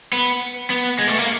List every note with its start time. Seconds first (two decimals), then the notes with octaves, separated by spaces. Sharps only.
0.13 B3
0.70 B3
0.99 G#3
1.07 A3
1.18 A#3